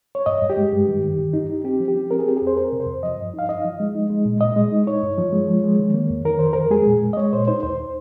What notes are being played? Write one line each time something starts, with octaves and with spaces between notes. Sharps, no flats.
C#5
G2 D#5
G2
G4
G#3
G2
D#3
D#3
G2
D#4
D#4
C4 G4
F3
G4
C4
C4 A#4
G#4
C4 G4
G#4
F2
C5
C4 A#4
C3
C5
F2
F3 D#5
G2
D#4 F5
D#4 D#5
F3
G#3
D#4
G#3
A#2
A#2 D#5
G#3
D#4
D#4 C#5
G2
F3
G#3
F3
G#3
D#3
A#3
F2
D#3 A#4
F2 C5
F2 A#4
G#3 G#4
A#2
G#3
D#5
G#3 C#5
A#2 C5
D#4 C5
D#2 C5